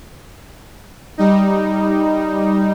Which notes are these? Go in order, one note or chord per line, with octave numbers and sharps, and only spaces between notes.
G3 D#4